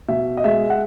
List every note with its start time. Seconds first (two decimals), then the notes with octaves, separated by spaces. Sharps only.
0.08 B2 E5
0.37 D#5
0.44 G#3 E5
0.70 F#5